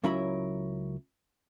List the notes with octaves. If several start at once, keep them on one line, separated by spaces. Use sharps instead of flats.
C#2 F#3 C#4 E4 A#4 B5